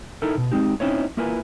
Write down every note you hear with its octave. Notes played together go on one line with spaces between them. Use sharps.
D#4 E4 A4 A#4
B2
G#3 C4 D#4 G4
C4 C#4 D#4 E4 C5 C#5
A#3 E4 F4 A#4 B4 G#5